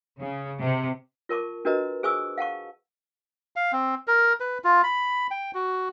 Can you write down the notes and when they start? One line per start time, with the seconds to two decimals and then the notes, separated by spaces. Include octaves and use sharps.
0.21 C#3
0.61 C3
1.29 F4 A#4 A5 C#6 D6
1.65 D4 F#4 A#4 B4 D#5 A#5
2.03 G#4 C5 G#5 C#6 D#6 E6
2.38 F5 F#5 A5 C#6
3.56 F5
3.72 C4
4.07 A#4
4.40 B4
4.64 F4
4.84 B5
5.31 G5
5.54 F#4